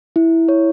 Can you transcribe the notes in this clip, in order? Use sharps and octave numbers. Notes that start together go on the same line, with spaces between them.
E4
C#5